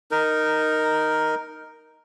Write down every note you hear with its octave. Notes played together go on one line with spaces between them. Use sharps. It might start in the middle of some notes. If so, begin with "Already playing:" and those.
D#4 A#4